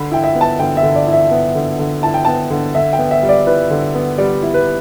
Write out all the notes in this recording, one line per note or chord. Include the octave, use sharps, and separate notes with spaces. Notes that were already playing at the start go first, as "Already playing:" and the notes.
Already playing: D3 B5
E4 G5
E5
B3
A5
D3 G5
E5
D3
D5
E4
E5
B3
D3
D3
E4 A5
G5
B3 A5
D3
D3 E5
G5
B3
E5
G3
D5
E4 B4
D3
B3
G3 D5
E4
B4